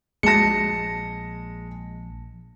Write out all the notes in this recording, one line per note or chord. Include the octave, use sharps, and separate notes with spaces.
A#1 G#3 A5 A#6 C#7